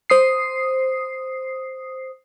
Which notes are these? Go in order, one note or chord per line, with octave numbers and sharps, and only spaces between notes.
C5 D#6 C7